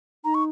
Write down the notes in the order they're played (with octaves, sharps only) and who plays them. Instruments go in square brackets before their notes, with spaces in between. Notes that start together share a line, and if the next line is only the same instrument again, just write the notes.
[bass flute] D#4 [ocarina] A#5
[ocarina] C#6